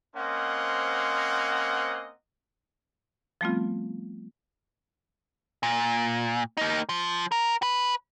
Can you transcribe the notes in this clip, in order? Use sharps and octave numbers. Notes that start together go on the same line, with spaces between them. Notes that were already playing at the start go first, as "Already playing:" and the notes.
A#3 C4 C#4 C5 D#5 F#5
F3 G3 A3 B3 C4 F4
A#2
A#3 D#4
F3
A#4
B4